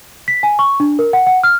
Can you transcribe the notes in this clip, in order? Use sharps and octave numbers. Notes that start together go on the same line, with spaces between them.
B6
G#5
C#6
D4
A#4
F#5
F#5
F6